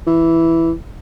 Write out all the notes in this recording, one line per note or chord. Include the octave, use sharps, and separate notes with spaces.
E3